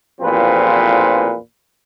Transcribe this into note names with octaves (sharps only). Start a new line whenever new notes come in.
A1 E2 A#2 F3 C4 B4